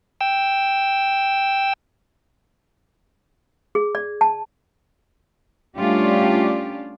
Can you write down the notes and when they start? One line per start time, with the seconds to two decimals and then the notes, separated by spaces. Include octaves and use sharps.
0.21 G5 E6
3.75 G#4
3.95 D5
4.21 A5
5.77 G3 A3 C#4 D4 F4 G4